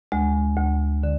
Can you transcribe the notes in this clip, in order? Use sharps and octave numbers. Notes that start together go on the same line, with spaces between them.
D2 G#3
D2
D3